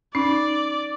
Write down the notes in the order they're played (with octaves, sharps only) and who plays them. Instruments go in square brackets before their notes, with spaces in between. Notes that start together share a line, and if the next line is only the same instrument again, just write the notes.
[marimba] C#4 D#4 [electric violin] D5